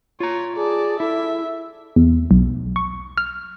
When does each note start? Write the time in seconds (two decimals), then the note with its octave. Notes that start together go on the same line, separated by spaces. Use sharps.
0.20 F4 C#5 A#5
0.57 G#4 D5 A5
1.00 E4 A4 E5
1.96 E2
2.31 B1
2.76 C#6
3.18 F6